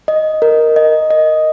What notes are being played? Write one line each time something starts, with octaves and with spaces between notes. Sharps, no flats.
D#5
A#4
D#5
D#5